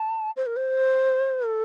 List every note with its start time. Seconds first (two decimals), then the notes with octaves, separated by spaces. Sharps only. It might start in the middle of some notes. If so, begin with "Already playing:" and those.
Already playing: A5
0.37 C5
0.46 A#4
0.56 C5
1.45 A4